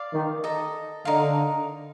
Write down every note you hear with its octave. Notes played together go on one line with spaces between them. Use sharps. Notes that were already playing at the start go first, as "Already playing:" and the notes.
Already playing: D5 F5 C6
D#3
A4 D#5 A#5
D3 D#4 A#4 F5 C6